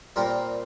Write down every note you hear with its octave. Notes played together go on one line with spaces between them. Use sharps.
A#2 G3 C4 A#4